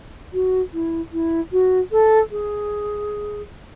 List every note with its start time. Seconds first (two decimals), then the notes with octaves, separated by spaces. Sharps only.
0.33 F#4
0.73 E4
1.12 E4
1.52 F#4
1.91 A4
2.30 G#4